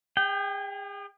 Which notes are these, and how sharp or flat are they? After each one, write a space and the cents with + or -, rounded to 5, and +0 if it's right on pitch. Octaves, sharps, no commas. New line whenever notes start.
G#4 -40 G5 +0